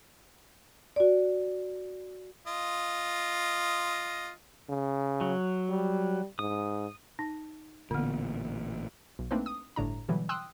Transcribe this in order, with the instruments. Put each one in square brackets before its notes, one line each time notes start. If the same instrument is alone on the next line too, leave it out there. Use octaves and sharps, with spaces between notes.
[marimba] F#4 D5
[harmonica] F4 D#5
[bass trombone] C#3
[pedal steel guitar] F#3
[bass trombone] G3
[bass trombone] G#2 [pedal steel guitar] D#6
[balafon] D#4
[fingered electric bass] A1 A#2 [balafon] D3 B3
[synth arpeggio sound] B1
A3 A#3 C4 D4 D#4 B4
D#6
G1 A2 D4 A#5
B2 D3 E3 F#3 G3
G5 C6 D#6 E6 F#6